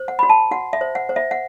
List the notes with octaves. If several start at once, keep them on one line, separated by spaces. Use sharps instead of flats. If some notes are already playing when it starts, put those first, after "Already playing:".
Already playing: C5
F#5
F#4 B5
A5
F#4 F#5
E5
C5
F#5
C5
E5
F#5